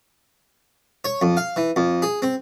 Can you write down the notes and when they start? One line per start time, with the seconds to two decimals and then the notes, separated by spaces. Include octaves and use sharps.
1.05 C#5
1.22 F2
1.37 F5
1.56 E3
1.76 F2
2.02 G#4
2.22 C4